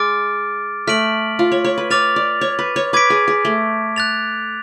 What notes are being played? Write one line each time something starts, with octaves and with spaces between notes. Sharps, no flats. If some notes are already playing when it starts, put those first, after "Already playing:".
Already playing: G#3 D6 F6 A6 D7
A3 F6 B6 D7 F#7
F4
C#5
C#5
B4
C#5 D6 F6 A6 F7
D5
C#5
B4
C#5
B4 D6 G#6 B6 D7
G#4
G#4
A3
F#6 A6 F7